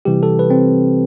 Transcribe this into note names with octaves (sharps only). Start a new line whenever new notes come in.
C3 E3 G3 G4
A4
B4
C4